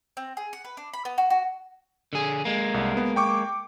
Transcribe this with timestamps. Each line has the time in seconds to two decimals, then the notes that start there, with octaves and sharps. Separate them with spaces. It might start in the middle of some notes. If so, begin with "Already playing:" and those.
0.17 C4
0.37 G#4
0.53 F#5
0.65 B4
0.77 D4
0.93 B5
1.05 B3
1.18 F#4
1.30 F#4
2.13 D3 G#4
2.45 G#3 A#3
2.74 C2
2.97 B3
3.16 G5 C#6 D6